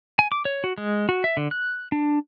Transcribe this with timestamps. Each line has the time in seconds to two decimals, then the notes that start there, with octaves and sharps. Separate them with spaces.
0.19 G#5
0.32 D6
0.45 C#5
0.64 F#4
0.78 G#3
1.09 F#4
1.24 E5
1.37 D3
1.51 F#6
1.92 D4